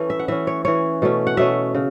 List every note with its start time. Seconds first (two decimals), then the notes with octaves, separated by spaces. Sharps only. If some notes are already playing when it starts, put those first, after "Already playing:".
Already playing: E3 A3 C#4 B4
0.10 E5
0.19 F#5
0.28 E3 C#4 E5
0.47 C#5
0.65 E3 C#4 C#5
1.02 B2 A3 C#4
1.27 F#5
1.37 B2 A3 C#4 E5
1.75 C#3